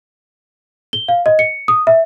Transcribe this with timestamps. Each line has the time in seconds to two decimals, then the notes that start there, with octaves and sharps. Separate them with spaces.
0.93 G7
1.08 F5
1.26 D#5
1.39 C#7
1.68 D#6
1.87 E5